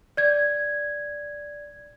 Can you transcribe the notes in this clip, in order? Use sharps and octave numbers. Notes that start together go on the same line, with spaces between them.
D5 G#6